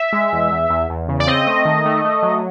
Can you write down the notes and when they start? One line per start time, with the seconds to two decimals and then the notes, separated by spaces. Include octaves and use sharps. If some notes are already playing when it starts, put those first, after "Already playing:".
Already playing: E5
0.13 G#3
0.33 E2
0.52 E2
0.70 E2
0.90 E2
1.09 C#3
1.20 D5
1.27 C4 D#5
1.47 A3
1.65 D#3
1.86 A3
2.05 A3
2.23 F#3